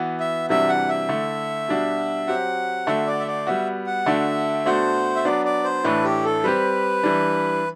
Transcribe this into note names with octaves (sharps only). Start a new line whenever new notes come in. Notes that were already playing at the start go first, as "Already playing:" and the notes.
Already playing: E3 B3 F#4
E5
C3 E3 G3 D4 F#4 E5
F#5
E5
D3 A3 E4
B2 G3 D4 F#4
F#3 C4 G4 F#5
D3 A3 D4 F#4 E5
D5
E5
D5
G3 B3 F#4 E5
F#5
D3 A3 D4 F#4 E5
B2 A3 D4 F#4 C5
E5
F#3 B3 D4 D5
D5
C5
A2 E3 A3 D4 B4
G4
A4
G3 C4 G4 B4
E3 G3 D4